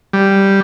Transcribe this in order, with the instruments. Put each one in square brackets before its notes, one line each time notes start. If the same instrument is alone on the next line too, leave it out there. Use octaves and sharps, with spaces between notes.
[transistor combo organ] G3